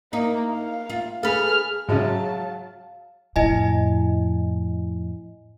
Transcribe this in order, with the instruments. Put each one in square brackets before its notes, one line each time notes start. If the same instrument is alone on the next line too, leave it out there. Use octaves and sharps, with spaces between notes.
[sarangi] A#3 [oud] D#4
[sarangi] F5
[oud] F4
[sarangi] G#4 [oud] A4 B4 [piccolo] F6
[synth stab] G#2 C#3 [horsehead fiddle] F#3 A5 [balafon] F#4 G#4 E5 [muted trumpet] F5
[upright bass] F2 A2 [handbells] E4 D#5 G#5